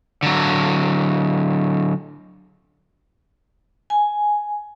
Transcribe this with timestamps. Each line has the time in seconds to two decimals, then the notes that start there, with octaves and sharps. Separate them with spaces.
0.23 D3 F#3
3.90 G#5